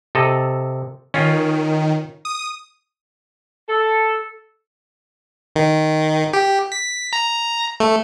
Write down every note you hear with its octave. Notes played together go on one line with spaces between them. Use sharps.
C3 A4 D#5
D#3 C#4 F4
D#6
A4
D#3
G4
B6
A#5
A3